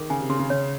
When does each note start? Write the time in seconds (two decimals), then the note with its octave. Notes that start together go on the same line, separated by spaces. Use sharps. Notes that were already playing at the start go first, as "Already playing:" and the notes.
Already playing: D#3 G#4
0.10 C#3 G#5
0.20 C3
0.29 C#3 C6
0.39 C#3
0.50 C#3 C#5